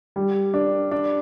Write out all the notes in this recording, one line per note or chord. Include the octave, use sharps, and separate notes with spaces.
G3
D4
D4